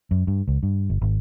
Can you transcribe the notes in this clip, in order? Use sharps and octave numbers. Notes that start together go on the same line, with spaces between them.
F#2
G2
C#2
G2
G1
G#1